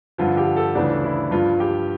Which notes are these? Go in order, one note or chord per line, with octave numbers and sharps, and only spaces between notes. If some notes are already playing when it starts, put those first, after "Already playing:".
G2 D3 F3 F4
G4
A4
D2 C#3 E3 D4
E4
G2 F3 F4
G4